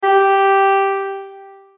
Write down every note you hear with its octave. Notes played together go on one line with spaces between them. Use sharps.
G4